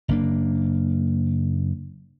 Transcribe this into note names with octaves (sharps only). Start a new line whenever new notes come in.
F#1 A#3 D4